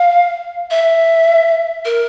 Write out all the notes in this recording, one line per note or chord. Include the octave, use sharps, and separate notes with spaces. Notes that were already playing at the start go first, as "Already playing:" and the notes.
Already playing: F5
E5
A#4